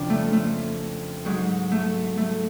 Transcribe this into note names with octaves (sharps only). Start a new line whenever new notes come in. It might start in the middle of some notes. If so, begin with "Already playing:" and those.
Already playing: F2 C#3 F3 D4
A3
A3
G#2 F#3
A3
A3